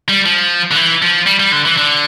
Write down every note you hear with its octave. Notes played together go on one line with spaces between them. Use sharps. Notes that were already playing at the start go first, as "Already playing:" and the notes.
G3
F3
D3
E3
F3
G3
G3
D3
E3
D3